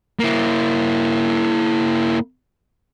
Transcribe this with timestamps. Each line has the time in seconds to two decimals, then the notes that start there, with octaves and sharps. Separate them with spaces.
0.19 A#3 E4